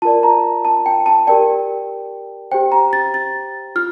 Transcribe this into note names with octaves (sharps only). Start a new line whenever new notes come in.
F4 A#4 D5 A5
A#5
A5
G5
A5
G4 A#4 D5 G5
G4 C5 G5
A#5
A6
A6
F4 F6